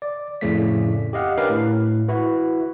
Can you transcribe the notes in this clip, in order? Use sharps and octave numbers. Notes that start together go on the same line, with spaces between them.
D5
F2 A2 C#3 A3 D5 B6
G4 D#5 F5 F#5
C#4 D4 G4 A#4 B4 F5
A2
E4 F#4 B4